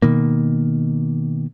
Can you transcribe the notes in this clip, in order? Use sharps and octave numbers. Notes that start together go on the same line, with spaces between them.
B2 D#3 A#3